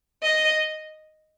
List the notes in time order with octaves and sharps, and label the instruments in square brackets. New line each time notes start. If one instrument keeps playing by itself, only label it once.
[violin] D#5